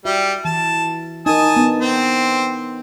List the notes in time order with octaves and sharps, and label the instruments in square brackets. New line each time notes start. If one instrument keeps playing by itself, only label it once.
[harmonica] G3 [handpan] F#4 E5
[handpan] E3 [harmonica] A5
[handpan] D#4 A#4 [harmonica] G#5 A5 D#6
[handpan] B3 D4 D#4
[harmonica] C4